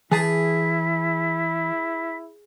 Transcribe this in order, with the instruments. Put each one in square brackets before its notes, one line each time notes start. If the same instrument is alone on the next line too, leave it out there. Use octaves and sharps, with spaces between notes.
[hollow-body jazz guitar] E3 A5 [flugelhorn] E4 [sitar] G#4 [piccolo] B6